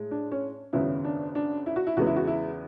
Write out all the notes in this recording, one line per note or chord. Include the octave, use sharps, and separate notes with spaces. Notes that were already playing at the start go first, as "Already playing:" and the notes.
Already playing: A2 G#3
D4
C#4
G#1 F#2 C#3 F#3 B3 E4
D4
D4
E4
F#4
E4
E2 C#3 G#3 B3 F#4
E4
F#4
E4